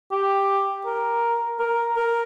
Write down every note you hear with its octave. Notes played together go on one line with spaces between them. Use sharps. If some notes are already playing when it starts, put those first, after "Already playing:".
G4
A#4
A#4
A#4